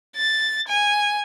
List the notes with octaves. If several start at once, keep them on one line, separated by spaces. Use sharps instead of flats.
A6
G#5